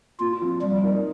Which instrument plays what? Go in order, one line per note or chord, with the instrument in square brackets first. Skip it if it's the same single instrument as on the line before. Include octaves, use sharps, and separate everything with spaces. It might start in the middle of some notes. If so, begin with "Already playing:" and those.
[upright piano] A#2 [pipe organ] F4
[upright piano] F3 C4 F4
[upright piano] F3 [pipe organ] G3
[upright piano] A#3 D#4